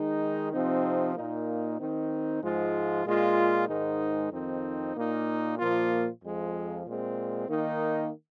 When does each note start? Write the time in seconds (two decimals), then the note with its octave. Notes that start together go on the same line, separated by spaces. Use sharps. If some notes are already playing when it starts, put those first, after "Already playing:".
Already playing: D#3 G#3 D#4
0.51 C3 F3 C4 D#4
1.15 A#2 A#3 D#4
1.79 D#3 C4 D#4
2.42 G#2 F3 G#3 F4
3.06 A#2 G#3 F4
3.68 G#2 D#3 G#3 D#4
4.31 F2 D#3 C4 D#4
4.95 A#2 A#3 D#4
5.59 A#2 F3 A#3 F4
6.22 F2 F3 G#3
6.86 A#2 G#3 C4
7.49 D#3 A#3 D#4